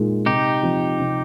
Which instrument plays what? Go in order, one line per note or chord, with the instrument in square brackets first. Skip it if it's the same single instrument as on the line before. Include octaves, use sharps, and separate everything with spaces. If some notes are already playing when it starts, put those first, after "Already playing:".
Already playing: [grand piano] A#2 G#3 D#4
[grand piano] C3 [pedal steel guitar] D#4 G4
[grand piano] F3 C4
C3